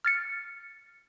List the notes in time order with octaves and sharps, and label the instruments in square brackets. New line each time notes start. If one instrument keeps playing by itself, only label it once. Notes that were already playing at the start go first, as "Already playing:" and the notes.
[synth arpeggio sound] F6 A6 C#7